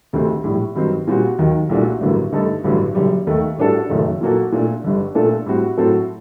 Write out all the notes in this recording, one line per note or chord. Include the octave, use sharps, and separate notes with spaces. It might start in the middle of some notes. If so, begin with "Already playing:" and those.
D2 C3 D#3 A3 C4
A#1 A2 G3
G2 D#3 F#3 C4
A#2 G3 C4 F#4
D#2 D#3 F#3
C2 A#2 A3 D4 F#4
A1 G2 D3 F#3 A#3
G2 D3 A3 D#4 A4
A1 G2 D3 F#3
F#1 F#2 D3 G3
D#2 D#3 A3
A2 G3 D4 F#4 A4
F#1 F#2 D#3 A3
A#2 F#3 A#3 F#4 A4
A#2 A3 D4
G1 G2 D3
A#2 A3 D4 A4
A2 G3 C4 F#4
A2 F#3 C4 F#4 A4